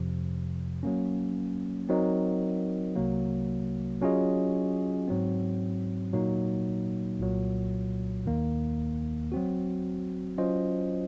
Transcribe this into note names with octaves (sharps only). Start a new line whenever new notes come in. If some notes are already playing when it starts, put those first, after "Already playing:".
Already playing: F2 C3 F3
F#3 A#3 C#4
F#3 C4 D#4 A#4 D#5
C2 C3 F#3 A#3
F#3 C#4 F4 G#4 D#5
G#2 F#3 C4
A#2 F#3 A#3 D#4
C2 A#2 F#3
D#2 D#3 A#3
F#3 C4 F#4
F#3 C#4 F4 C5 D#5